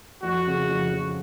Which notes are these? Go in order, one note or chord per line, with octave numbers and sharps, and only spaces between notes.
F2 F#4
C#3
F2
F2